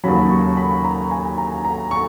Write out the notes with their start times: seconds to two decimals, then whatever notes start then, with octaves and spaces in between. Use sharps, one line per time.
0.04 D#2 C#3 F#3 B5
0.30 C#6
0.57 B5
0.84 A#5
1.11 G#5
1.38 A#5
1.65 A#5
1.91 C#6